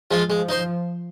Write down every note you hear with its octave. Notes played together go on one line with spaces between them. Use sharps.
F3 G#3 F4
F3 G#3
D#4 C5